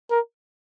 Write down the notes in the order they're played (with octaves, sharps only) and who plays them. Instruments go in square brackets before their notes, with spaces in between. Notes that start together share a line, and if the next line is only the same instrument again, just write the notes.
[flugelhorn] A#4